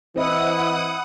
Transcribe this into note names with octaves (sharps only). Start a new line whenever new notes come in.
E3 C4 E4 D#5 F#5 D#6